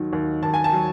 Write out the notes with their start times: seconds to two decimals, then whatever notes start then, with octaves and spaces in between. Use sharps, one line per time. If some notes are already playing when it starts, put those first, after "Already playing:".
Already playing: D#2 D#3 F#3
0.13 D#2
0.43 D#2 A5
0.54 G#5
0.64 A5
0.72 F#3